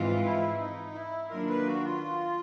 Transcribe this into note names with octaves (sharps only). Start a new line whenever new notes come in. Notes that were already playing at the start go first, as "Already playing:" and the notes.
Already playing: G#2 E3 G#3 C4 F4
E4
D#4
E4
D#3 F#3 A#3 D4 F4 A#4
B4
F#4
F4